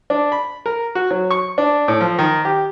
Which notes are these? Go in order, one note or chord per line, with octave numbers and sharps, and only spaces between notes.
D4
B5
A#4
F#4
F#3
C#6
D4
A2
F3
D#3
G4